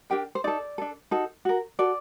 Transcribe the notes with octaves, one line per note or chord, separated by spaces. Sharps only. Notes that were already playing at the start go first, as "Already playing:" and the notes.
D4 G4 A#4 G5
C5
D#4 A4 D5
D4 A4
D#4 F#4 A4
F#4 A#4
F#4 A4 D5